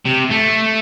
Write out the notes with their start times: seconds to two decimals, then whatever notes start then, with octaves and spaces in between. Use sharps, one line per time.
0.05 C3
0.30 A3